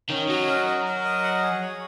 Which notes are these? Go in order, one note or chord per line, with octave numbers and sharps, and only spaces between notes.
D#3 C#4
F#3 D#5
A#4
A#4
A#4
D#5
F#5
G#4
C#5